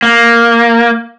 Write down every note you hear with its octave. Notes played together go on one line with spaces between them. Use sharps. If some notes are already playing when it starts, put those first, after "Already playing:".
A#3